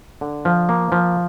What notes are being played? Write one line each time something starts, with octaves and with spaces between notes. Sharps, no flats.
D3
F3
A#3
F3